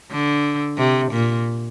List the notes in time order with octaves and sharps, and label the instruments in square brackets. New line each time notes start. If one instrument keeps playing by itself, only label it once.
[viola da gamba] D3
C3
A#2